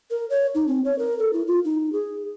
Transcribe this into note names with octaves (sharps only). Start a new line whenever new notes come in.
A#4
C#5
D#4
C4
C#5
A#4
A4
E4
F4
D#4
G#4